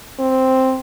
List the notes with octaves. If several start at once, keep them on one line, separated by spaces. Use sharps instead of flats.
C4